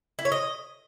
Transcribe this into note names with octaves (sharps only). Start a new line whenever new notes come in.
E4
C#5
D#5